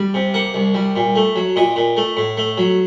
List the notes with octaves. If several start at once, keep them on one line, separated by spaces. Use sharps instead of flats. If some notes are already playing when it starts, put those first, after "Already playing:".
Already playing: G3
C3
A#3 F#5
C2
G3
A#2
A3
F#3
A#2 D#5
A#2
A3
A2
A3
F#3